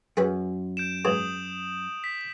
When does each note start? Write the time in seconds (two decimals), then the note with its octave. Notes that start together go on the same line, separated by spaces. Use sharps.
0.17 F#2 G#4 B4 B5
0.77 G6 D7 E7
1.05 G#2 E3 F#3 D#6 E7 F#7
2.04 B6